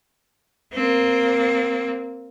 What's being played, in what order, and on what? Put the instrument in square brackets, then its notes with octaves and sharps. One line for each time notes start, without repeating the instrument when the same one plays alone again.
[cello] A#3 C4